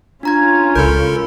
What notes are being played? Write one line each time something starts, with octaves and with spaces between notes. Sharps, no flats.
C#4 D4 F4 A#5 G#6
C#2 A4 A#4 B5 G6